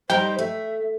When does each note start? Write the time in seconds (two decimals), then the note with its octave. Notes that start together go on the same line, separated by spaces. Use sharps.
0.10 G3 D#4 G4 A#4 C5 G5
0.39 A3 E5